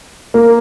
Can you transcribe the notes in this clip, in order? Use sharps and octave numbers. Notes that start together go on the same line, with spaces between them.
A#3